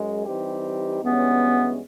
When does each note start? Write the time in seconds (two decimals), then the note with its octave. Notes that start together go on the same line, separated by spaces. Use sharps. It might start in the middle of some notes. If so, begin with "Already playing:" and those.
Already playing: F#2 G#3
0.25 E3 G3 C4 D#4 G4
1.02 G2 E3 G#3 B3 C#4 F#4